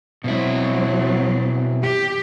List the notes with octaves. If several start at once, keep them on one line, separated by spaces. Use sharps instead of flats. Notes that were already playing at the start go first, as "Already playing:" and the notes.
B2 F#3 C4 E4
G4